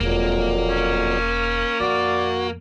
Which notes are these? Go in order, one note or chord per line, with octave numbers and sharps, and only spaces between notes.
E1 F2 A#2 F#3 A#3
C#4
F2 A#2 F#4 D5